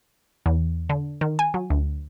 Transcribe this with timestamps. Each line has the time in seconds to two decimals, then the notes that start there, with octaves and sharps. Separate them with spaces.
0.46 E2
0.89 D3
1.21 D#3
1.39 G#5
1.54 F#3
1.70 D2